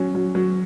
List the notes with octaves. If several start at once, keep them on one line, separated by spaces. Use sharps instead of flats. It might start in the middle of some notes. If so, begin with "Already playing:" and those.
Already playing: F#3 C#4
F#3
F#3